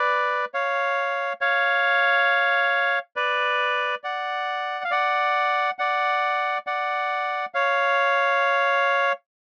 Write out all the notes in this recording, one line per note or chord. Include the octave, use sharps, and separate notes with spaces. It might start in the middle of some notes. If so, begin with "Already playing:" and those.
Already playing: B4 D5
C#5 F5
C#5 F5
B4 D5
D5 F#5
F5
D5 F#5
D5 F#5
D5 F#5
C#5 F5